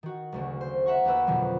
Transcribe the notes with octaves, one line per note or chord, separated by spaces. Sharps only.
D#3 F#4
F#1 D2 C#3
C5
E5 F#5 A#5 C#6
D#2 A#4 B4 E6
F2 B2 D3 D#3 F#3